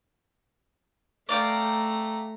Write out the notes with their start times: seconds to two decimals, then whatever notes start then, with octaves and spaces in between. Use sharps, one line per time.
1.29 A3 D5 F5 G5 A#5